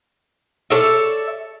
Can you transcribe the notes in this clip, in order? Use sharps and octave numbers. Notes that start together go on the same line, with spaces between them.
A4 C#5 D5 E5